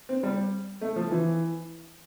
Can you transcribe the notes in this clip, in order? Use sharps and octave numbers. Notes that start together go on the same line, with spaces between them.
C4
G3
A3
F3
E3